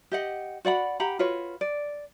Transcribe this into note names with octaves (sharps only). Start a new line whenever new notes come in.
G4 D#5 F#5
F#4 D5 F#5 B5
G4 F#5 A#5 B5
F4 F#4 B4 C#5
D5